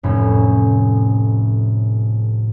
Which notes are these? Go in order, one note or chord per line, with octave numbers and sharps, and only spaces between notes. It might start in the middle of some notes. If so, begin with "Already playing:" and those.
F1 A2 C#4